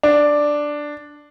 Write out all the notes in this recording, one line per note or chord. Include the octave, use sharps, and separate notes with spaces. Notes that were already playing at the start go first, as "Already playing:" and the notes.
D4